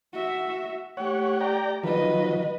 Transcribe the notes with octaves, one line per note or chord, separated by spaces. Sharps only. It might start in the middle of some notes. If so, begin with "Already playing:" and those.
F#4 E5
A3 G4 C#5 F#5
D5 G5 A#5
D#3 F3 F#3 B4 D#5